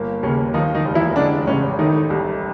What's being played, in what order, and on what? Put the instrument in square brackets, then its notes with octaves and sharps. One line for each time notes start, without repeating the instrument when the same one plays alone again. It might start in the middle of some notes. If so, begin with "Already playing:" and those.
Already playing: [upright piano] G1 A#3
[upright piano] D#2 [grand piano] C#3 C#4
[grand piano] D#3 D#4 [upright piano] F3
[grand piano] D#3 D#4
[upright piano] F1
[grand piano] E3 E4
[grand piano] D3 D4 [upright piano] G#3
[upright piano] A1 [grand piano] C#3 C#4
[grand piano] D#3 D#4 [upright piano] A3
[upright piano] C2